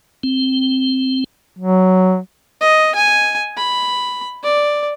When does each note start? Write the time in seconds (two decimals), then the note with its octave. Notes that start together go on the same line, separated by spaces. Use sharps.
0.23 C4
1.59 F#3
2.61 D#5
2.95 G#5
3.57 B5
4.43 D5